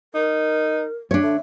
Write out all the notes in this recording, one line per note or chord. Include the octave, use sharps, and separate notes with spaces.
D#4 A#4
G3 D4 C#5
D3 E5